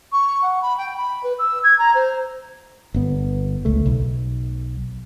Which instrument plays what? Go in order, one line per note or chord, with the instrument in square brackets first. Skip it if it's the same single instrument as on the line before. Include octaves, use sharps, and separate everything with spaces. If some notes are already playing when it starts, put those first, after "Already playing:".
[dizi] C#6
F#5
B5
G5
B5
B4
E6
G#6
A#5
C5
[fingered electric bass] G1 B3
C#2 A3
B1